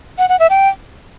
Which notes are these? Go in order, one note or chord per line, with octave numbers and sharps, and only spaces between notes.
F#5
F#5
E5
G5